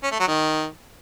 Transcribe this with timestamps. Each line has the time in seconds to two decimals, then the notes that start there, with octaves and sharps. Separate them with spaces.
0.03 C#4
0.11 A3
0.20 F#3
0.28 D#3